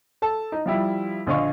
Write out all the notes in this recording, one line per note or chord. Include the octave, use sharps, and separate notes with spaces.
A4 A5
D#4
F3 G3 E4
A#1 D3 D#5 F5 C#6